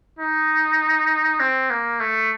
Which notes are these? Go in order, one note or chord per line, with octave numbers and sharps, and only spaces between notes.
D#4
C4
A#3
A3